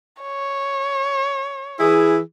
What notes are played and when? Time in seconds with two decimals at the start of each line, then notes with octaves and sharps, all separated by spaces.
0.22 C#5
1.80 E3 E4 G#4